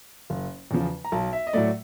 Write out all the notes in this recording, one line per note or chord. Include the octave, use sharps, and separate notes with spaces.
F#1
E2 C#3 F3
A#5
B1 A5
E5
D#5
A2 F#3 A3 D5